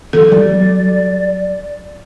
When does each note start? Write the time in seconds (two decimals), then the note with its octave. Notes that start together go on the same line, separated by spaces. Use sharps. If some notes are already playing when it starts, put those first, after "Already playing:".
0.13 E3 F#3 B3 A4
0.30 F#3 G3 D5